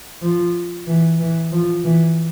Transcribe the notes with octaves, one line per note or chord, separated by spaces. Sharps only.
F3
E3
E3
F3
E3